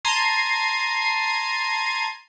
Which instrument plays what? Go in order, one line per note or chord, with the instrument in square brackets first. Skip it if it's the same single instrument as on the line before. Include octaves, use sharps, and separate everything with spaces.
[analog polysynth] A5 A#5 C6 G#6 C7 D#7